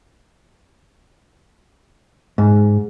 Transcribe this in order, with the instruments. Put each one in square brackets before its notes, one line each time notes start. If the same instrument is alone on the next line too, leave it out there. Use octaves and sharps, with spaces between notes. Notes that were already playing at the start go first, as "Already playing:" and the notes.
[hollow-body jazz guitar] G#2